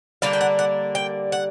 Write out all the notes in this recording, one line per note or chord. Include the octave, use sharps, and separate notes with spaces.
D3 G3 A#3 D4 F5
G5
F#5
F#5
G5
F#5